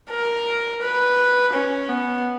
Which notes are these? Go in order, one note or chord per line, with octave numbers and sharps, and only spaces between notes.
A#4
B4
C#4
B3